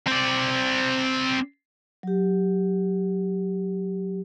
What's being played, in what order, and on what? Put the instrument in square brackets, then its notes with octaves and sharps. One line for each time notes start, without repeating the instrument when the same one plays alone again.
[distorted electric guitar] C4 D5
[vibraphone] F#3 G4